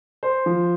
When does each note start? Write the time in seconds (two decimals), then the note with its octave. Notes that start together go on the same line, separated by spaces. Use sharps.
0.23 C5
0.46 F3